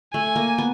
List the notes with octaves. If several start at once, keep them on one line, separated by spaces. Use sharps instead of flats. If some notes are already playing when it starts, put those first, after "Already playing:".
A3 G#5
A#3
B3